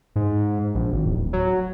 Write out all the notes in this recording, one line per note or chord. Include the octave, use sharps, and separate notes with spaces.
G#2
A#1
G#1
D1
F#3